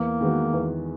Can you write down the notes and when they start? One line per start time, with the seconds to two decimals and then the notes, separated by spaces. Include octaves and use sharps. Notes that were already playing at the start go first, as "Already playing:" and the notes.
Already playing: E2 A#3
0.21 D#3 G#3 B3 F#4
0.53 E2